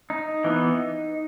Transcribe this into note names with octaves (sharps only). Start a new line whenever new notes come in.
D#4
E3 B3